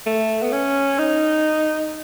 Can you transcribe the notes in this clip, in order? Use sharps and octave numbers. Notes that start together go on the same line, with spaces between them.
A3
B3
C#4
D#4